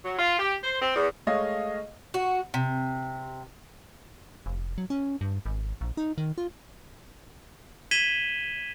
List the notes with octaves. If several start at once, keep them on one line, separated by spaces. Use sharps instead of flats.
F#3
F4
G4
C5
C4
E2
G#3 A3 C#5 D#5 F5
F#4
C3
F1
F#3
C#4
G2
G#1
A#1
D#4
D#3
F4
G#6 B6 D#7 E7 F#7 G7